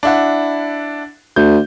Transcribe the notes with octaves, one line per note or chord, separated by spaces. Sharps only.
D4 E4 F#5
D2 G6